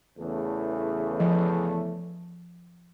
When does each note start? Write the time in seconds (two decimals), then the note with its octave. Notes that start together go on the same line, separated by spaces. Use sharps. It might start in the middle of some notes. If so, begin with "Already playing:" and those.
0.19 E2 C#3 A3
1.20 F3